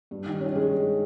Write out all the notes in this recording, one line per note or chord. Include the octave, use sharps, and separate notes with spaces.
G2
D#3
C#4
G#3